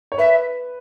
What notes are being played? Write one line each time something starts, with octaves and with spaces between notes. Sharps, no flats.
C#5
B4 E5